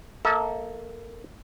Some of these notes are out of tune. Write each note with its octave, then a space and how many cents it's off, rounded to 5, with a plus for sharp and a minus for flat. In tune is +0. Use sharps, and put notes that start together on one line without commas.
A#3 +0 A4 +0 E5 -45